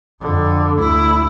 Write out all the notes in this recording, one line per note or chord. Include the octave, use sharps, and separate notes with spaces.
F2 D3
D2 E4